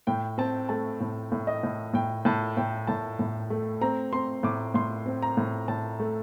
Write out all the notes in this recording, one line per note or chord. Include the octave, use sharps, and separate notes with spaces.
A2 G5
C4 A5
A3 A5
A2
A2
D#5
A2
A2 G5
A2 A5
A2 G5
A2 A5
A2
A3
C4 A#5
C4 C6
A2 D6
A2 C6
C4
A#5
A2
A2 A5
A3